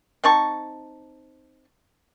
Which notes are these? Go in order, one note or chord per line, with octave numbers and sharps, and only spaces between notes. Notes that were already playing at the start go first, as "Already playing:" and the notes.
C4 D#4 A5 C#6